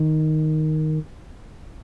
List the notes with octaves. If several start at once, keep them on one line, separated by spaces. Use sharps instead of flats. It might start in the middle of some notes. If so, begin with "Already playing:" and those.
Already playing: D#3